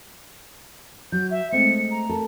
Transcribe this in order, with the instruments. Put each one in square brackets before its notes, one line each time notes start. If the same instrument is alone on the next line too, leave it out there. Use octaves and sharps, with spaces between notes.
[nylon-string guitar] F#3 [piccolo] G6
[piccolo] E5
[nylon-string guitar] G#3 A3 C4 [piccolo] C#7
[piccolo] A#5
[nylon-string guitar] A4 A#4